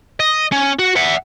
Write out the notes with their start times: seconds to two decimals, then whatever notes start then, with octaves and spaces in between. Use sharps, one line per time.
0.20 D#5
0.52 C#4
0.79 F#4
0.96 E5 F#5